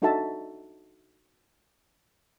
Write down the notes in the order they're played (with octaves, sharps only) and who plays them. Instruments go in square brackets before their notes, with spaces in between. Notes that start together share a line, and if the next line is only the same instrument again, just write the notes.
[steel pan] D4 D#4 F#4 A4 E5 A5